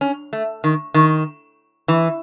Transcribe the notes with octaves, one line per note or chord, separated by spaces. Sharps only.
C#4
A3
D#3
D#3
E3